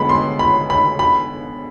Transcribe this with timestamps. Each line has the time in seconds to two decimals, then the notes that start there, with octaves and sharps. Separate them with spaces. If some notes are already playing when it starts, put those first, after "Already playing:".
Already playing: D3 G#3 B3 B5
0.09 C6
0.39 B5
0.70 B5
0.99 B5